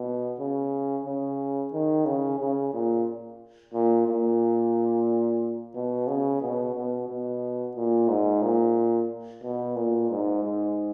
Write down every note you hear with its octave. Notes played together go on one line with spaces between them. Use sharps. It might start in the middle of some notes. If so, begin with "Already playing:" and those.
Already playing: B2
C#3
C#3
D#3
C#3
C#3
A#2
A#2
A#2
B2
C#3
B2
B2
B2
A#2
G#2
A#2
B2
A#2
G#2
G#2